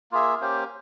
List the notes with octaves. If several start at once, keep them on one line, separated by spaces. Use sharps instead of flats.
A#3 F4 G#4 E5
A#3 C#4 G4 C5